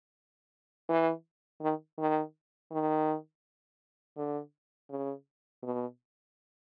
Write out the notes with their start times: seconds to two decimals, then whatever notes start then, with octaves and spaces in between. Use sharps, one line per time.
0.89 E3
1.61 D#3
1.99 D#3
2.72 D#3
4.17 D3
4.90 C#3
5.63 B2